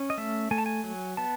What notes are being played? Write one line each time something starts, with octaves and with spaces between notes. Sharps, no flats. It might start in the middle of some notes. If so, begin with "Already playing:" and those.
Already playing: C#4
D#5
A3 E5
A3 G#5
A5
G#5
F#3
B3 A5